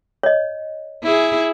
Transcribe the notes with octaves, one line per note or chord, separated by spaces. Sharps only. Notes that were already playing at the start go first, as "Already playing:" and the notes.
C#5 D#5
E4 G#4